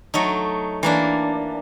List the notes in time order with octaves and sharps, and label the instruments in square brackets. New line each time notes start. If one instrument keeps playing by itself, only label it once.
[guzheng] F#3 A3 D#4
E3 A#3 D4